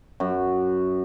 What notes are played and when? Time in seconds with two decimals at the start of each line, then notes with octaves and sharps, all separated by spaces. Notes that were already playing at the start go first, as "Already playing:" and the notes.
0.20 F#2